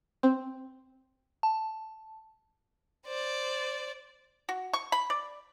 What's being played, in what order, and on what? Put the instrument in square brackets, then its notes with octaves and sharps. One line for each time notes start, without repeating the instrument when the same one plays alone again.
[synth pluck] C4
[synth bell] A5
[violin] C5 D5
[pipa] F#4
C#6
B5
D5